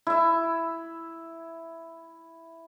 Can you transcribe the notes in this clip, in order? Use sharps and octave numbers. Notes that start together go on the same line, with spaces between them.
E4 E5